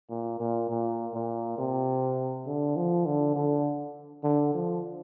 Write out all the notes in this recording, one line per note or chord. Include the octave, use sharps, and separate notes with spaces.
A#2
A#2
A#2
A#2
C3
D3
F3
D3
D3
D3
F3